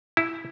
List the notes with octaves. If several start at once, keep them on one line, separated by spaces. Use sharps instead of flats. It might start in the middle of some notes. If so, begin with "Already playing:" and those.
E4